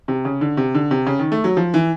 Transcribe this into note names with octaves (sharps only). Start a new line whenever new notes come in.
C3
C#3
D3
C3
D3
C3
C#3
D#3
A3
F#3
F3
E3